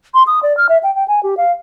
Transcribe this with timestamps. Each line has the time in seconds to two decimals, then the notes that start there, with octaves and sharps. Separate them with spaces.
0.14 C6
0.27 D#6
0.43 D5
0.57 F6
0.69 E5
0.83 G5
0.95 G5
1.08 G#5
1.23 G4
1.37 F5